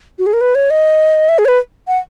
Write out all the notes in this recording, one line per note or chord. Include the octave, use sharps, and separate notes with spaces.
F#4
G#4
A#4
B4
C#5
D#5
E5
G#4
C#5
B4
F#5